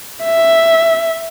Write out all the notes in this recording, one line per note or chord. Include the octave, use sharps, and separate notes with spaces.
E5